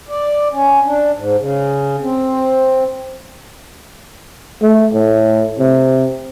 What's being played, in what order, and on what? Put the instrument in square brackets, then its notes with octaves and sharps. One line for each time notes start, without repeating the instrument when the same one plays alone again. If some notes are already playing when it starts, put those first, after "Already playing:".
[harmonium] D5
C#4
D4
G#2
C#3
C4
[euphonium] A3
A2
C3